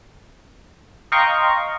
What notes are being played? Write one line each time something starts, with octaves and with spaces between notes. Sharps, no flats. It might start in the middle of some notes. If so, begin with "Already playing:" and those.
D#5 F5 G5 A#5 C6 C#6